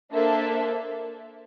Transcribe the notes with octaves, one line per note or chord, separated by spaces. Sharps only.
A#3 D4 A4 C5 E5